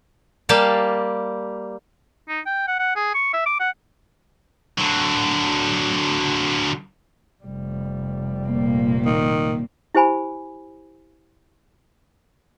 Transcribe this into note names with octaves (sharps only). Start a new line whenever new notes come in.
G3 A#3 G4 F5 A5
D#4
G5
F#5
F#5
G#4
C#6
E5
D6
F#5
D3 F#3
F1 G3
A#2 A#3
D#3
E4 G4 C5 G#5 B5